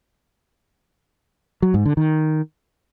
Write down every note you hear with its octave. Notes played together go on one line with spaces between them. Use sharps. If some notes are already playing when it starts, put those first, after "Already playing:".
F#3
G#2
D3
D#3